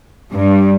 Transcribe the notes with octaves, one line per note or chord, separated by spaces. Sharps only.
G2